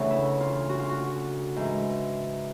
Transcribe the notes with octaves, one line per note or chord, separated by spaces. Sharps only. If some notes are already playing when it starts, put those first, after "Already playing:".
Already playing: D2 C#3 E3
E4
F4
F#4
F4
F#4
G#2 E3